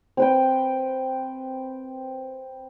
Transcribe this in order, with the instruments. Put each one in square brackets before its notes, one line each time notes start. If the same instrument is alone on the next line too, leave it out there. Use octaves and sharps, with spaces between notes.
[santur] C4 B4 G5